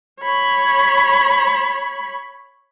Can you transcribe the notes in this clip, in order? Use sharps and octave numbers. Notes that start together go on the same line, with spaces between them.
C#5 B5